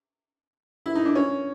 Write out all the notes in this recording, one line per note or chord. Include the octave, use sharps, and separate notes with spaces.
E4
D#4
D4
C#4